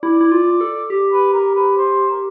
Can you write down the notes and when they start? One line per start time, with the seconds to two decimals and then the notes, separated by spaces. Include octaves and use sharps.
0.03 E4 D5
0.21 E4
0.32 F4
0.61 A4
0.90 G4
1.12 B4
1.34 A#4
1.55 B4
1.77 C5
2.10 A#4